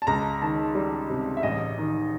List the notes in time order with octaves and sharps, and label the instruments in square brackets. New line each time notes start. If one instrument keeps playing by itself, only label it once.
[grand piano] A5
C#2 A#5
D#3 A5
G3
C3
E5
A1 D#5
D#3